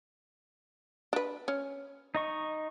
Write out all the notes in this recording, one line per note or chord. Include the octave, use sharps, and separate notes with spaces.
D4 B4
C#4
D#4 D#5 C#6